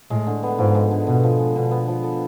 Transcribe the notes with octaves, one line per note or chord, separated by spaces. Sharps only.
A2 G#3
D3
B3
G#2 F3
G#3
D3
B2 B3
F3
G#3
B2 D3
B3
F3
A4